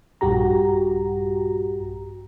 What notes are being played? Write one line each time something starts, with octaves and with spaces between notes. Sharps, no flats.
A#1 G2 F#4 G4 A#5